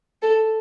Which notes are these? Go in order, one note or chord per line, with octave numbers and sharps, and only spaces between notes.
A4